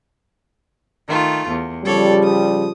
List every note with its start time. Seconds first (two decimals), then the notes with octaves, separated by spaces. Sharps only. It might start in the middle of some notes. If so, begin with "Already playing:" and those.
1.08 D#3 A3 F4
1.48 E2
1.84 C#3 F3 G3 A4 C#5 D5
2.23 D#6